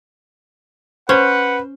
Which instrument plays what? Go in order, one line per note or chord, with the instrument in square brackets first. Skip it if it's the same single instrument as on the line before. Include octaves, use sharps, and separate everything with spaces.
[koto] C#4 [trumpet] B4 [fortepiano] C5 [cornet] F#5